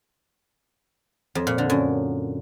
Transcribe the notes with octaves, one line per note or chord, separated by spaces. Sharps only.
F2
A#2
D3
F#2